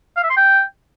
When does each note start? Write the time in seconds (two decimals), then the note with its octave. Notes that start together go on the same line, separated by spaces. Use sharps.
0.17 F5
0.23 E5
0.30 C6
0.36 G5